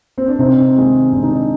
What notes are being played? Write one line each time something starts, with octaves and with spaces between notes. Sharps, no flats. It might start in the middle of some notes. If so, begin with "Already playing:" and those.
C4
D4
C3 C4 D#4
D#3 G#3
C3 D4
D#4
D4